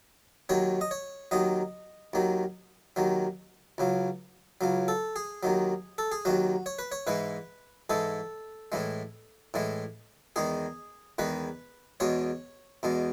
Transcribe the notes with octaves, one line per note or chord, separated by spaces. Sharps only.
D#2 D#3 F#3 C#5
D#5
C#5
D#2 D#3 F#3 D#5
D#2 D#3 F#3
D#2 D#3 F#3
C#2 C#3 F#3
C#2 C#3 F#3
A4
G#4
D#2 D#3 F#3
A4
G#4
D#2 D#3 F#3 F#4
C#5
B4
C#5
G#2 E3 G#3 B4
G#2 E3 G#3 A4
A2 E3 G#3
A2 E3 G#3
E2 D#3 G#3 G#4
E2 D#3 G#3 B4
E2 B2 G#3 C#5
E2 B2 G#3